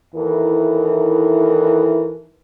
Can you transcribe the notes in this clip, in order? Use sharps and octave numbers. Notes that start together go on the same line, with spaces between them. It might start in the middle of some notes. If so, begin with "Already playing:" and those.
D#2 E3 D#4 E4 A4 A#4